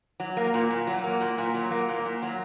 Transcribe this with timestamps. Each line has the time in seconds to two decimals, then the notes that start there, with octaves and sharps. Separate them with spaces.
0.20 F#3
0.37 A#3
0.54 A#2
0.71 A#2
0.87 F#3
1.04 A#3
1.21 A#2
1.38 A#2
1.54 F#3
1.71 A#3
1.89 A#2
2.06 A#2
2.22 F#3